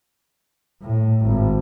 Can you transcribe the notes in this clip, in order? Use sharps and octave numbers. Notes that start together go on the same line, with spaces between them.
A2
G#1